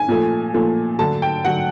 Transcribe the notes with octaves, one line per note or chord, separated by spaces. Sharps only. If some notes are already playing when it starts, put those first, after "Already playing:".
Already playing: G#5
A#2 F3 A3
A#2 F3 A3
D3 F#3 A3 A5
G5
D3 F#3 A3 F#5